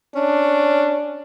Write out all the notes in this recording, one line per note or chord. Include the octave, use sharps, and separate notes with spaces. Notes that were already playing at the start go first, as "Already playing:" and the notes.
C#4 D4